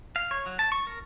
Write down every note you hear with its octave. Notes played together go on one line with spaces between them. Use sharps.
F5
C#5
F#3
A5
C#6
A#4